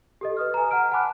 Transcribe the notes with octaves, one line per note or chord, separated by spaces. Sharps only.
G4 A4 D#5
B4 D#6 F6
G#5 A#5
F#5 A#5 F6 D7
F#5 G#5 A5 B5 D6 F#6